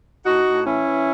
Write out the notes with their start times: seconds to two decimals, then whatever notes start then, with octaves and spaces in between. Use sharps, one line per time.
0.25 A2 D#4 F#4
0.45 A2
0.66 E3 C#4 E4
0.86 E3